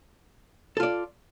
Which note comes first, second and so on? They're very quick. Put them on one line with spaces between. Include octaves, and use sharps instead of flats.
A4 F4 D5